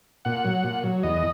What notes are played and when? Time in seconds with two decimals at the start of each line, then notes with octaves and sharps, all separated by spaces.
0.25 A#2 F#5
0.45 F#3
0.64 A#2
0.84 F#3
1.03 E2 D#5